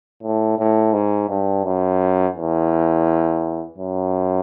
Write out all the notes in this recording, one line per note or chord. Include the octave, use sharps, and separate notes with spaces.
A2
A2
G#2
G2
F#2
E2
F#2